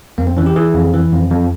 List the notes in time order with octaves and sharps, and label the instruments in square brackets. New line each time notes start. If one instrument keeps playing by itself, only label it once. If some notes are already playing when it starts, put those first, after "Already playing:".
[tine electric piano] F2 A#3
C4
E3 C#4
G4
E3 G#4
F2
E3
F2
F2